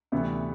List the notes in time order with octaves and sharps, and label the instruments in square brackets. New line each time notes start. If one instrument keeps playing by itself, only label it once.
[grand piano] D2 C3 E3 B3 E4